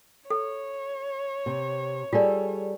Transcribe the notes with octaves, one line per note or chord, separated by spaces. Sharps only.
A4 C#5
C3
G3 F4 G#4 A4 D5